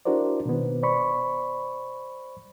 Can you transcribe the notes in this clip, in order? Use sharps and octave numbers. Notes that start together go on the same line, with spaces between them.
D4 E4 F#4 A#4 C5 D5
B2 D#3 B3
C5 D5 B5 C#6